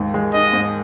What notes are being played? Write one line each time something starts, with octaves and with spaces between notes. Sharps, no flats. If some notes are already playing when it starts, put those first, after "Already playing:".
Already playing: D#2 G#2
G#3
D#4 D#5
G#2